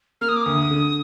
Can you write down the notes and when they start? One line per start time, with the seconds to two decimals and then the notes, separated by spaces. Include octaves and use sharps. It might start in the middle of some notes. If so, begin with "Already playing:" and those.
0.21 A#3 F6
0.28 D#6
0.36 D6
0.44 D2 D#6
0.70 D3